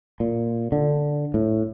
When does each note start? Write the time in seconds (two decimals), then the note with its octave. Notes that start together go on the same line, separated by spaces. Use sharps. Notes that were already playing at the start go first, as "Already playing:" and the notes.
0.20 A#2
0.72 D3
1.34 A2